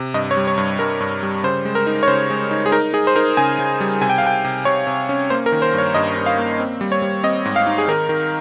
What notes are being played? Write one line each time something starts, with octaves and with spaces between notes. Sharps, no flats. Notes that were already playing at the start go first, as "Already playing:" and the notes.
Already playing: C3
G2 D#5
C#5
G3
C#5
G2
G2 A#4
G2
G3
C#3 C5
G#3
A#4
D#4
C#5
C#3 C5
G#3
D#4
G#4
D#4 A#4
D#4 G#4
C5
D#4 A#4
C#3 G#5
C#3
G3
C3 G#5
G5
F5
C3 G5
C3
C3 C#5
C3
C#4
A#3 C5
A#4
D#3
C5
G2 C#5
G2 D#5
G2
F5
A#3
C4
G3
C#5
G3
C4 D#5
G#2
F5
D#4
G#4
D#3 A#4
D#3